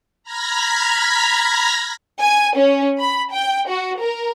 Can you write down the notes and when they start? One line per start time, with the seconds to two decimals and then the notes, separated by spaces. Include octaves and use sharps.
0.23 A#5 B5 F6 G#6 A#6 B6
2.19 G#5
2.57 C#4
2.99 B5
3.31 G5
3.68 F#4
3.99 A#4